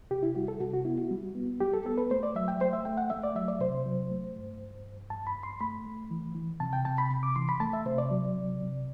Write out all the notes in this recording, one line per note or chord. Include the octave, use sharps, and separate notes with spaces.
C3 G4
E4
G3 F#4
A4
C3 F#4
F#4
B3 E4
F#4
G3
B3
G3 G4
A4
B3 A4
B4
A3 C5
D5
F#3 E5
G5
A3 C5
E5
A3 G5
F#5
A3 E5
D5
F#3 E5
D5
C3 C5
F#3
A3
G2
G2
G2
G2 A5
B5
G2
C6
A3 B5
A3
E3
E3
C3 A5
G5
C3 A5
B5
C3
D6
E3 C6
B5
A3 A5
E5
C3 C5
D5
F#3
C3
C3